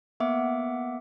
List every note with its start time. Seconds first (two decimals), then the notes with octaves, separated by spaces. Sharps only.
0.20 A#3 B3 E5 F#5 D6